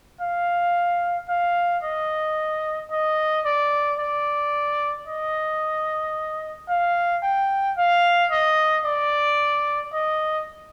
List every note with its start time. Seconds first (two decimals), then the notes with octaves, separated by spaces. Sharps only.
0.21 F5
1.29 F5
1.83 D#5
2.91 D#5
3.45 D5
3.99 D5
5.07 D#5
6.69 F5
7.23 G5
7.77 F5
8.31 D#5
8.85 D5
9.93 D#5